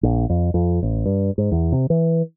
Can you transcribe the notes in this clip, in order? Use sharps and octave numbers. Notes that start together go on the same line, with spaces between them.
A#1
F2
F2
A1
G2
G#2
E2
C3
E3